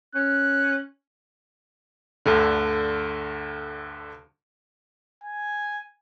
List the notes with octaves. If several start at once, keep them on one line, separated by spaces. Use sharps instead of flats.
C#4 F#6
D2 G2 D3
G#5